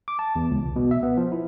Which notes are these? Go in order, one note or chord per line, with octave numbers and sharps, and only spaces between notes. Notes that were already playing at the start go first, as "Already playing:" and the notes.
D6
A5
E2
C#2
C2
B2
E5
B3
F3
E4